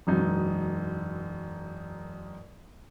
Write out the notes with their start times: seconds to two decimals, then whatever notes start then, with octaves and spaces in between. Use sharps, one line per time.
0.07 E1 F#2 D#4